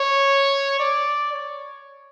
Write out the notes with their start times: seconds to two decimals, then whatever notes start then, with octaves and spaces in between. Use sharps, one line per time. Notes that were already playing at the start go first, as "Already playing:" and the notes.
Already playing: C#5
0.79 D5
1.33 C#5